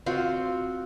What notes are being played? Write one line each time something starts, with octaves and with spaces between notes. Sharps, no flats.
C4 F4 F#4